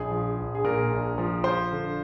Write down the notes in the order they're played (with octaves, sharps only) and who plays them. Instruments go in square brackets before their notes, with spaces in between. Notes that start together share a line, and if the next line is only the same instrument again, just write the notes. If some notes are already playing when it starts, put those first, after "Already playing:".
Already playing: [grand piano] A#1 G#4
F3
A#1
G#4
A#2 A#4
A#1
F3
F3 C5
D3